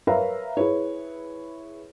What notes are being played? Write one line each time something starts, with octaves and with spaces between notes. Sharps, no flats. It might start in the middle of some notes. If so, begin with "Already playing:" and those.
A#4 B4 C#5 E5 F5 A#5
E4 G#4 B4 C#5